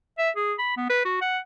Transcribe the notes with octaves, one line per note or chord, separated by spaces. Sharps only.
E5
G#4
B5
B3
B4
F#4
F#5